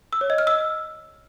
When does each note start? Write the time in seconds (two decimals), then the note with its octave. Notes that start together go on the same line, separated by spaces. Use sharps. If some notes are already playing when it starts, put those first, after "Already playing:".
0.13 E6
0.21 C#5
0.30 D#5
0.38 F6
0.47 E6